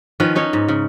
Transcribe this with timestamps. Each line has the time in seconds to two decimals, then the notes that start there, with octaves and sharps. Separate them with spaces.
0.20 D#3 F3 C#4 B4
0.35 C#4 D#4 C#5
0.53 G#2
0.69 C#3